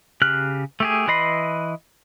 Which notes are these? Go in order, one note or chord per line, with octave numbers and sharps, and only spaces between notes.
C#3 G4 F6 F#6
A3 G4 G#4
E3 B4 D#5 B5 C6